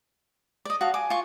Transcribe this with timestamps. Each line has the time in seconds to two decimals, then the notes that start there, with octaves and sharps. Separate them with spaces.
0.65 D5 D#5
0.81 F#4 F5 A5
0.94 G#5 D6
1.10 F4 C#6